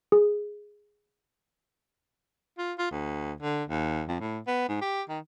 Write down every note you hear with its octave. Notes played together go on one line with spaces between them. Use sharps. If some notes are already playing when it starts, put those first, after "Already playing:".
G#4
F4
F4
D2
D3
D#2
F2
A2
B3
G#2
G4
D#3